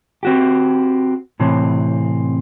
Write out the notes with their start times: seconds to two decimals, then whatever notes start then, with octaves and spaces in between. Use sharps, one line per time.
0.23 C4 F#4 G4
1.40 A2 C3 E3 C4